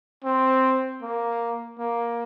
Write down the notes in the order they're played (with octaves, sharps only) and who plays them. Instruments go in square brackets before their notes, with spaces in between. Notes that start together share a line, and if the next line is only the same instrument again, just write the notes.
[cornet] C4
A#3
A#3